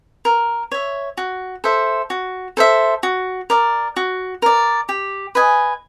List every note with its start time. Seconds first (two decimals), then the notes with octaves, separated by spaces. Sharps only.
0.25 A#4
0.72 C#5 E5
1.17 F#4
1.64 A4 C5 E5
2.10 F#4
2.57 A4 C5 E5
3.03 F#4
3.50 A#4 D5
3.96 F#4
4.42 A#4 D5
4.89 G4
5.35 B4 D#5 G#5